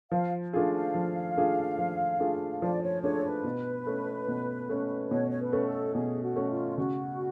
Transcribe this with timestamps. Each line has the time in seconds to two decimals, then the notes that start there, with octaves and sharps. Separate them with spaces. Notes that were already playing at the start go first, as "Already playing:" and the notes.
0.11 F3 F5
0.53 A3 D4 F4 G#4 F5
0.74 F5
0.95 F3
1.37 A3 D4 F4 G#4
1.78 F3
2.20 A3 D4 F4 G#4
2.62 F3 D5
2.82 C#5
3.03 A3 D4 F4 G#4 C#5
3.15 A4
3.24 B4
3.44 B2
3.87 A3 C#4
4.28 B2
4.69 A3 C#4
5.11 B2 C#5
5.31 C#5
5.39 B4
5.53 A3 C#4
5.66 A4
5.94 B2 G#4
6.22 F#4
6.36 A3 C#4
6.50 F4
6.78 C#3 F#4